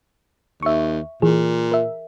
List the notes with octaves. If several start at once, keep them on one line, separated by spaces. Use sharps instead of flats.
D#2 E5 C#6
A#2 E3 G#4
A#4 E5